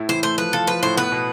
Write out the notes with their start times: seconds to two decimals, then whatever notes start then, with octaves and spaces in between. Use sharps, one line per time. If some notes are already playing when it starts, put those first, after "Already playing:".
Already playing: A2 E4
0.09 E3 C5
0.23 A3 C5
0.38 F3 B4
0.53 F4 A4
0.67 F3 B4
0.82 A2 C5
0.97 B3 B4
1.12 B2